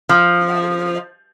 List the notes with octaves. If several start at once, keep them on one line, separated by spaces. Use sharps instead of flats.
F3